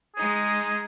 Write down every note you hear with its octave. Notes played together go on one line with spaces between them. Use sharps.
G#3 D#4 G#4